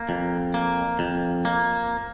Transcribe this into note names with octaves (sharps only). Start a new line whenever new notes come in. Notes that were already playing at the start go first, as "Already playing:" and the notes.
Already playing: A#3
F2
A#3
F2
A#3